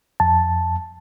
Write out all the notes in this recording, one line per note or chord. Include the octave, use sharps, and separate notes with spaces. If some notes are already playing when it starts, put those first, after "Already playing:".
F2 A5